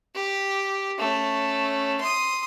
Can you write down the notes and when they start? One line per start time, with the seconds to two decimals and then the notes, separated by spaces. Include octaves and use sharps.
0.15 G4
0.98 A3 C#4
2.00 C6 D#6